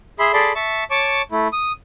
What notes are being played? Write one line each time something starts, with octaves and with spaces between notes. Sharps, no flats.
G#4 E5 B5 C6
G#4 A4 D5 B5 C6
E5 A5 C#6
C#5 A5 C#6 D6
A3 E4
D#6